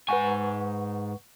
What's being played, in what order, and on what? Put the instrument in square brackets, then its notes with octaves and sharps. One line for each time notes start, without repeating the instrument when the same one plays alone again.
[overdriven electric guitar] G#2 G#5 [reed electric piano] B4 F#5 C#6